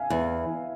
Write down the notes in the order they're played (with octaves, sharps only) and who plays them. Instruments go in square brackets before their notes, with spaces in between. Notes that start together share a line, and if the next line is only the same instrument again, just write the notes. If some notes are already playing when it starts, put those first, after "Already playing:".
Already playing: [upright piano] E5 F5 G#5
[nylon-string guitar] E2